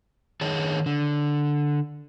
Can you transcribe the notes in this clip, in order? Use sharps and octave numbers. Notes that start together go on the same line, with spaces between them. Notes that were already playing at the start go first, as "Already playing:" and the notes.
D#3 G#4 C#5 A5
D3